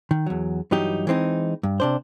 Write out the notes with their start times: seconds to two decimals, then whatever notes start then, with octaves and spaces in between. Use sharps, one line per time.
0.11 D#3
0.26 E2 F#3
0.71 G2 E3 F#3 D#4 G4
1.07 E3 G#3 C4 D4 D#4
1.63 G2
1.80 C3 D4 C5